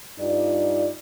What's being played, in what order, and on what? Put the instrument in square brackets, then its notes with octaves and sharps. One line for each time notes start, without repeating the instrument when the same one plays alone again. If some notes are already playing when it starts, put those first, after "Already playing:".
[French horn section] G2 D#4 F4 D5